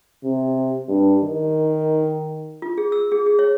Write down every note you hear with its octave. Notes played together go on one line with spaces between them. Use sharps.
C3
G2
D#3
F4
G#4
E6
G#4
G#4
C#5